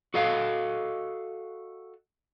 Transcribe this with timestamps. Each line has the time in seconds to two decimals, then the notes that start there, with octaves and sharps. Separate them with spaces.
0.14 F#4 A4 D#5 F5